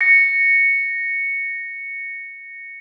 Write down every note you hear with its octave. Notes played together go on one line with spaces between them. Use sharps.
A#6 C#7